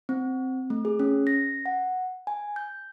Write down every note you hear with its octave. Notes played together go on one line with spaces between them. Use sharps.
C4
A3
G#4
C#4
A#6
F#5
G#5
G6